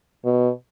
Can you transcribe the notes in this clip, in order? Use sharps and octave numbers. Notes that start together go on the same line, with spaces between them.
B2